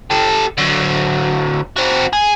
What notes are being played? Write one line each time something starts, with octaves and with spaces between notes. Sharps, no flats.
G4 A4
D3 F#3
C4 F#4
G#4